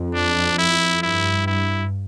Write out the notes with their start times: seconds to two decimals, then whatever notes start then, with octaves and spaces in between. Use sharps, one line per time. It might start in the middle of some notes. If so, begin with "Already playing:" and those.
Already playing: F2
0.14 D4
0.59 E4
1.03 G2 E4
1.47 E4